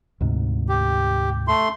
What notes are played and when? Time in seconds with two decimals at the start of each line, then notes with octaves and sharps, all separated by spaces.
0.21 D2 G#2 C3
0.69 G4
1.48 A3 C6